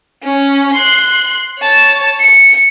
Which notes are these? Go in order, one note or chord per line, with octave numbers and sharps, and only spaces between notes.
C#4
C6 F#6
C#5 A5
C#7